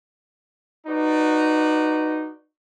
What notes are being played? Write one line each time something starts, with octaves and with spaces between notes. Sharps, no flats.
D#4 F#4 B4 D5